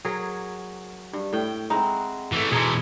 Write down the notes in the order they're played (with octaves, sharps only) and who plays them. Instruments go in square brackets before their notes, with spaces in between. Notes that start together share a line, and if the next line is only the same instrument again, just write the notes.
[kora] F#3 G#4 A#4
G2
A2 G5
[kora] G#3 C4 [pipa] D#4 E4 F#4
[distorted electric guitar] E3 A3
[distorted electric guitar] B2 E3 [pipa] G#3 D#4 A4 [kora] G#4